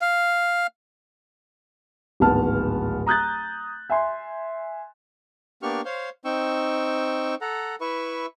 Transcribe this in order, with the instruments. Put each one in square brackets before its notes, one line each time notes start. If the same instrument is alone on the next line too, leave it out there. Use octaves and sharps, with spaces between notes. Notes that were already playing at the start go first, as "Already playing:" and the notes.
[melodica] F5
[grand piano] D1 G#1 B3 A5 F6
A#5 D#6 F#6 G6 A6
E5 G#5 C6
[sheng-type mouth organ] A#3 B3 D4 G4 C#6 F6
C5 C#5 F5 C6
C4 D#4 G5 C#6 E6
A4 F#5 A#5
E4 B4 E5 C#6